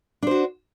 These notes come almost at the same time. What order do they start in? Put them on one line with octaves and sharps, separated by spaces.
D4 C5 F#4